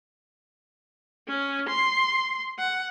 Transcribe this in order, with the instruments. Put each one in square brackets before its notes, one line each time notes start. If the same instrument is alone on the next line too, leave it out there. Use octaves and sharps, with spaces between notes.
[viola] C#4
C6
F#5